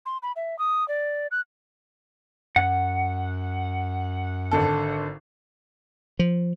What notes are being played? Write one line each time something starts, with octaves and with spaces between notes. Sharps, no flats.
C6
B5
E5
D#6
D5
F#6
F#2 F#5
G#1 D3 A4
F3